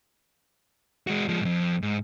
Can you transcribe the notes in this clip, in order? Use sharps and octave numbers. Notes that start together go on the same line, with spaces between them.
G#3 F#4
F3 G#3
F2 G#2
G#2